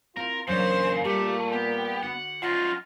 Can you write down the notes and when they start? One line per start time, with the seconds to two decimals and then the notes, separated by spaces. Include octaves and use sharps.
0.17 C4 E4 F4 A#4 C5
0.47 E2 A#2 C#3 F#3 A#3 D4 C5
1.04 G3 A3 F4 G4
1.52 B3 G4
2.03 D3 F#4 F#5
2.42 F#2 D#4 F4